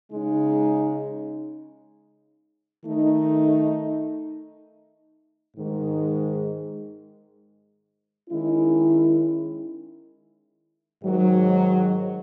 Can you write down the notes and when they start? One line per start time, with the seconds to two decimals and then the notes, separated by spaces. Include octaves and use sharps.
0.12 C#3 G#3 D#4
2.85 D#3 A3 D#4
5.57 G#2 D#3 G#3
8.30 D#3 G#3 C#4 E4
11.04 G#2 D#3 F#3